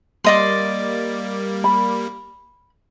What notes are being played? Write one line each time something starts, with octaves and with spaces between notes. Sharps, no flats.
G3 A#3 D5 D#5 C6
B5